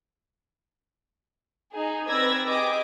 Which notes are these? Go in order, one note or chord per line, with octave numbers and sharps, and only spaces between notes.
D#4 G#4
C4 B4 D5 E6 G#6 A#6
G4 G#4 D#5 D6